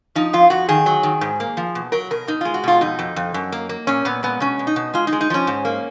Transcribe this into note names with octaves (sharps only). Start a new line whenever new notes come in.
F3 D#4
F2 F4
F2 F#4
D#3 G#4
F#3
D#3
G#2
A#3
F3
B2
F#3 A#4
B2 A#4
B2 D#4
G#3 F4
F#4
B2 F4
F2 D#4
F2
F2
F#2
A#3
A#3
A#2 C#4
A#2 B3
G#3 B3
B2 C#4
B2
D#4
B2
G#3 F4
D#4
G#3
D#4
F3 C#4
G#2
A#3